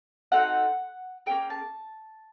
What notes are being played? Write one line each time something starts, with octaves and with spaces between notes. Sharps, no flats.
C4 D#4 F#4 A4 F#5
A#3 C#4 E4 G#4 G5
A5